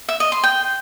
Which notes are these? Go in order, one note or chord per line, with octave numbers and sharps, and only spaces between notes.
E5
D#5
C6
G5